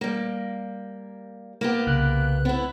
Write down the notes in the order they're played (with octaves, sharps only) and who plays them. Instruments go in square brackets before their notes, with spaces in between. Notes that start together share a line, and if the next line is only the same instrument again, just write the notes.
[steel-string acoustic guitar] G3 A#3
A#3 B3 G4
[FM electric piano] C2 C#3 F#6
[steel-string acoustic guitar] B3 E4 [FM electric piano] C4